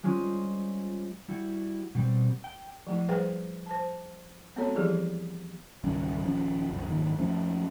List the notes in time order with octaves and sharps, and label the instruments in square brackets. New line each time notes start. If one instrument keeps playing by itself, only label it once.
[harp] G3 G#3 C#4 F4 C5
[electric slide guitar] G3 E4 F#4
B2 G3 C4
G5
[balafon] F3 A3 E4
G3 G#4 B4 C5 F#5 G5
C5 A5
G#3 B3 C4 F#4 A4 C#5
E3 F3 G3 E4 G4 G#4
[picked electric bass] G#1 C#2 G3 C#4
D#1 F3 C#4
F#1 C2
F1 D#2 G#2
F2 F3 A3 C#4